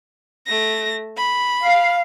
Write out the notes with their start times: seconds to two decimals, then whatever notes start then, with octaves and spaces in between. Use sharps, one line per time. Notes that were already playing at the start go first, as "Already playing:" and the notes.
0.47 A3 A#6
1.17 B5
1.62 F5